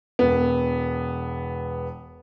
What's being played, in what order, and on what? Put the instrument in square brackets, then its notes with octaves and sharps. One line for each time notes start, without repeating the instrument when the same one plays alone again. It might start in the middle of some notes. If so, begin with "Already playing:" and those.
[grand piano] E1 B3